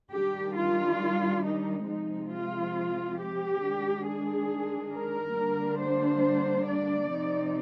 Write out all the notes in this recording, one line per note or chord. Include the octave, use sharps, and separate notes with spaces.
D#3 G3 D4 G4
F4
D#4
C3 F3 G#3 C4 D#4
F4
G4
D#3 G#3 D4
G#4
A#4
D3 G3 A#3 D4
C5
D5
C3 F3 C4 D#4